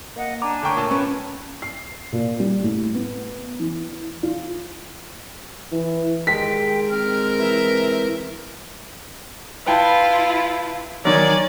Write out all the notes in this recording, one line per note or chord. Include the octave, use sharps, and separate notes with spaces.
A#3 D#5 F#5
D4 D5 G#5 A#5
D3 A3 A#4 C#5 G5
A#2 A5
C#4 B4 G5 C#6
C7
A#2
G3
A2
B3
E3
F4
E3
D#3 G#3 G5 B6
C4 A#4 F6
E3 E5
E4 F4 B4 G5 A5
D#3 F#3 D5 G#5